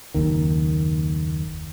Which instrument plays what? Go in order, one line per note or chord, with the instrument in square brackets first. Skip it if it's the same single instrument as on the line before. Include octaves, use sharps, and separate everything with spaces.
[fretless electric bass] F#1 D#2 D#3